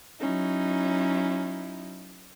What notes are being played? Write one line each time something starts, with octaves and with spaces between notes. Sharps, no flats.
F#3 C#4 D#4 E4